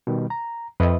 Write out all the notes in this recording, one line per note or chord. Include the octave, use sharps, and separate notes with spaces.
B2 D#3 G3
A#5
F2 B4 D#5 E5